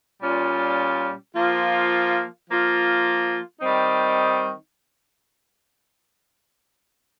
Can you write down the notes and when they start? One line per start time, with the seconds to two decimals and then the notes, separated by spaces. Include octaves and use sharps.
0.21 A#2 G3 C#4 F4
1.34 F3 A#3 F4
2.48 F3 A#3 F4
3.61 D#3 G3 C4 D#4